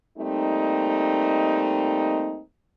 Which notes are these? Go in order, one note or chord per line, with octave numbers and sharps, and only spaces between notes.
G3 A3 A#3 C4 D#4